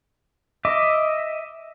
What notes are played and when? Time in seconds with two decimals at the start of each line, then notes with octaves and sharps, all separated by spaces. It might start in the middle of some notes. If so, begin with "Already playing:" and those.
0.65 D#5 E5 D6